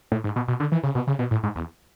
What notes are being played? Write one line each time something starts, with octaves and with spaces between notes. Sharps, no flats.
A2
G#2
B2
B2
D3
E3
C#3
B2
C#3
B2
A2
G#2
E2